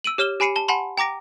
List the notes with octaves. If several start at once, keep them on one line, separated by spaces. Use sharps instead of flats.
E6 D7 D#7 F#7
G4 C#5 F6 E7 G7
G4 G#5 B5 C7 C#7 D#7
A5 G7
F#5 G#5 A5 B5 C6
G5 A#5 D6 A#6 D7